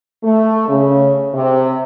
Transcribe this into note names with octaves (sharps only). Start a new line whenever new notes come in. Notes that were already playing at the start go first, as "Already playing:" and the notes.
A3
C#3
C3